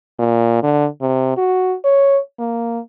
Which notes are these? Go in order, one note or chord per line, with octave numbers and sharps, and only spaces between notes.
A#2
D3
C3
F#4
C#5
A#3